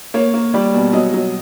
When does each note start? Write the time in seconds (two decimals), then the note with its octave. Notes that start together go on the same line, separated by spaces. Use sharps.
0.14 A#3 C#5
0.34 A#3
0.54 G3 D5
0.74 B2
0.93 F#3 D#5
1.14 F#3